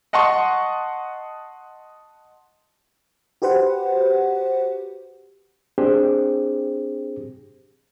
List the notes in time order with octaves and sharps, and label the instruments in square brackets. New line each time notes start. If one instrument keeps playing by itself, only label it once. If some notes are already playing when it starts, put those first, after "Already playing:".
[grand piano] D#5 F#5 A5 C6 C#6
[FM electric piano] F#4 G4 B4 C5 F#5
[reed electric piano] C4 D4 G4 G#4 C5